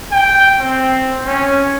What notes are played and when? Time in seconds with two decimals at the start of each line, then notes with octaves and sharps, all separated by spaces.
0.12 G5
0.60 C4
1.26 C#4